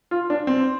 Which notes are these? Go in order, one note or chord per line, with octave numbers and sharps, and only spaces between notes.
F4
D4
C4